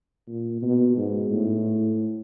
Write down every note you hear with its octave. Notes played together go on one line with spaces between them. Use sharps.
A#2
B2
G#2
A2